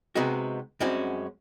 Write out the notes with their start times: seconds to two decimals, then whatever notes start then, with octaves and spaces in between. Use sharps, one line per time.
0.15 C3 G#3 B3 D#4 F#4
0.80 F#2 G3 G#3 C4 C#4 F#4